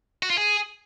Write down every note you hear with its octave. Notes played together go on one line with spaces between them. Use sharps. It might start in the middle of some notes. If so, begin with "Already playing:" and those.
F#4
F4
G#4